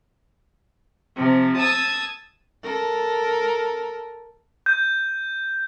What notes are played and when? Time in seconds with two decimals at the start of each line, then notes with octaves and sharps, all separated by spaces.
1.15 C3 F3
1.57 A5 D#6 E6 G#6
2.63 A4 A#4
4.66 G6